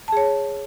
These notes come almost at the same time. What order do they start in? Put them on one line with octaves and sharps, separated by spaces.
A5 G#4 C#5